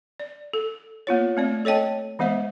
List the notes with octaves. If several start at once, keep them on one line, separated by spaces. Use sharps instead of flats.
D5
A4
A#3 B3 F4 C#5
A3 C4 D5
A4 C#5 D#5 G5 A5
E3 G#3 B3 C5 E5